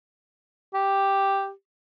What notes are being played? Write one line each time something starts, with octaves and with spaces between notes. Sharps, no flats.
G4